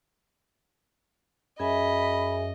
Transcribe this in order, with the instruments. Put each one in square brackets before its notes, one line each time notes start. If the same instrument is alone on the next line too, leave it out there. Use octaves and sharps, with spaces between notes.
[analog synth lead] F#2 [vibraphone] G#4 E5 G#5 [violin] D#5 [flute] B5